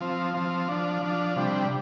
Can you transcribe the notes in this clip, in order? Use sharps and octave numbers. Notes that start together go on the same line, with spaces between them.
F3 C4
F3 C4
F3 D4
F3 D4
C3 G3 D4